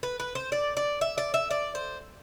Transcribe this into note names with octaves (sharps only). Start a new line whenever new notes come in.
B4
B4
C5
D5
D5
E5
D5
E5
D5
C5